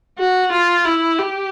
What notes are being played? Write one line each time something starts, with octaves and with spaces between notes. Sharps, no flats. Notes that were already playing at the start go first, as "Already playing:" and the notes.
F#4
F4
E4
G4